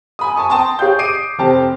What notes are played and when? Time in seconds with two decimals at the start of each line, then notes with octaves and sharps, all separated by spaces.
0.19 G#5 B5 D#6
0.36 G#5 A5 C#6 D#6
0.50 G5 A5 A#5 C6 D#6
0.79 G#4 C#5 F5 G5 G6
0.99 D6 D#6 C7 D7 D#7
1.39 F1 C4 G4 A5